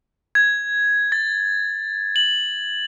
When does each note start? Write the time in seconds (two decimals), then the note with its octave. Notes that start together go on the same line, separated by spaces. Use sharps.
0.35 G#6
1.12 A6
2.16 F#7